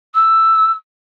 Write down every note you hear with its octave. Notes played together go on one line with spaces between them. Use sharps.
E6